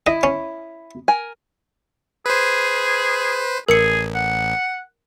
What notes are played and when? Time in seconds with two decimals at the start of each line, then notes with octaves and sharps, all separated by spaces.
0.07 E4 D#5
0.23 C#4
1.08 A#4 G#5
2.26 G#4 B4 C5
3.69 A1 G#4 A#4 C#7
4.15 F#5